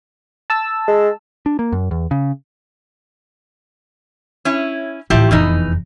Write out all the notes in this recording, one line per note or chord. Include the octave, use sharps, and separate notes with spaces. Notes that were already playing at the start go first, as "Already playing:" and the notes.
A5 E6
G#3
D4
A#3
F#2
E2
C#3
C#4 E4
A1 D2 F3 E4 G4
F1 E2 B2 E3 D#4